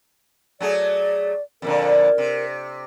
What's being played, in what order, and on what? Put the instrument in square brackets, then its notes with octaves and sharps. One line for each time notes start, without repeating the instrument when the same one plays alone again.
[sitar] F#3 A3 G#4 [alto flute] D5
[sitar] F2 A#2 D3 [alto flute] A#4
[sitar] C3